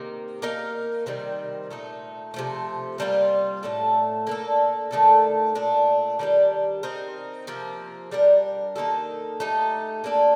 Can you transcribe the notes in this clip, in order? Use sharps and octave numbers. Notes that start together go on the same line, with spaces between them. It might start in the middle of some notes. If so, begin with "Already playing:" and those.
Already playing: C3 D#3 A#3
A#3 D#4 A#4 F5
C3 D#3 G3 C4
A#2 A3 D#4
C3 F3 A3
C3 G3 A#3 F4
A2 A3 D4 A4
A#3 D4 A4
D#3 A3 D4 A4
A#2 A3 D4
D#3 G3 D4 G4
C4 D#4 A#4
C3 F3 A#3
G3 D4 G4 A#4
D#3 A#3 D#4 A4
A3 D#4 G4
A#3 D4 A4